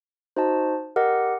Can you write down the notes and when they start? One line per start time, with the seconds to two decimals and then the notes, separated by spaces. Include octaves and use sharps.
0.36 D#4 F#4 C5 D#5 A5
0.96 G4 A#4 D#5 F#5